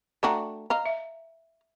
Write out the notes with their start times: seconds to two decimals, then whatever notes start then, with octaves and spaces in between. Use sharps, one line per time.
0.23 A3 D4 F#4 G5 A#5
0.70 D#5 F5 A#5
0.86 E5